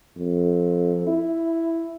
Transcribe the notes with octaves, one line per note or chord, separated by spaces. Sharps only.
F2
E4